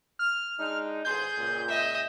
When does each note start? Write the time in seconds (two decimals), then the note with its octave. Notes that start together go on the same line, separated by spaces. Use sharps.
0.19 F6
0.58 G#3 D4 D#4
1.05 A1 G#4 C5 G6
1.36 C#2 A#2
1.68 D#5 E5